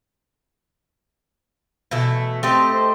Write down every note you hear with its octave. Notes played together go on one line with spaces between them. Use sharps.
B2 E3 A3
A3 C4 G4 D#5
C5